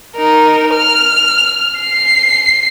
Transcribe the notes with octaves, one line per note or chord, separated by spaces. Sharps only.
D#4 A#4
F6
C7